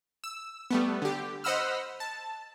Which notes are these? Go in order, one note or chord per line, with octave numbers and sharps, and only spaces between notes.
E6
G3 A3 B3
D3 G4
C5 D#5 F#5 B5 E6 F6
A5